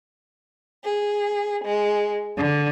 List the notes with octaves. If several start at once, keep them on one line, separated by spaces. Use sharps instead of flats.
G#4
G#3
D3